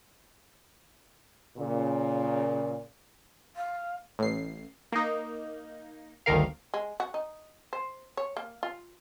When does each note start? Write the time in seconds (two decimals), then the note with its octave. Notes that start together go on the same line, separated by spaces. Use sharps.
1.57 A#2 C#3
3.56 F5
4.19 A1 C7
4.92 A#3 D#4
6.26 G1 D2 D#3 A#4 F5
6.74 G#3
7.00 F#4
7.14 D#4
7.73 C5
8.17 C#5
8.37 A#3
8.63 F4